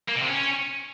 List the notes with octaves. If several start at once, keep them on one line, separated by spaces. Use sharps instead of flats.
A#3
B2
C3
C#4